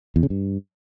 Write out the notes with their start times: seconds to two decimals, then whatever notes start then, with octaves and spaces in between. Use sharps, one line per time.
0.16 E2
0.23 C#3
0.30 G2